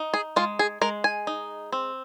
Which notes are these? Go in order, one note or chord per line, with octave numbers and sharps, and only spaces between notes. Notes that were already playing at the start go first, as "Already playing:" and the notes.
Already playing: D#4
G#4
G#3 F4
G#4
G#3 A#4
G#5
D#4
C4